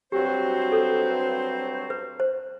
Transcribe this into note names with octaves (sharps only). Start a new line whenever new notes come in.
G2 F#3 C4 F#4 G4 C5
A4
B4
C5